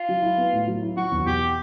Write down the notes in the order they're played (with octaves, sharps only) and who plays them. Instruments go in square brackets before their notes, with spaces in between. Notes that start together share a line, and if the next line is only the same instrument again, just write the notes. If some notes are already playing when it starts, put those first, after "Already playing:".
Already playing: [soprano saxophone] F4
[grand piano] F#3
E4
B3
A2
F#3
E4
[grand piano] F#3 [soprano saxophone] F#4
[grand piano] E2
[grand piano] B2 [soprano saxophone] G4